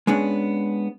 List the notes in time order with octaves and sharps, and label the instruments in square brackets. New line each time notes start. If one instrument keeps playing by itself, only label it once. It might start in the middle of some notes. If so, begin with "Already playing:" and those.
[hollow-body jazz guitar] G#3 B3 C#4 D4